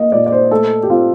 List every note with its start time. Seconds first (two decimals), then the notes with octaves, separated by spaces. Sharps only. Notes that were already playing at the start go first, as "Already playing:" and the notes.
Already playing: A#3 D#5
0.12 A#2 D5
0.26 D5
0.32 C5
0.51 A3 A4
0.83 G4
0.90 C4 F4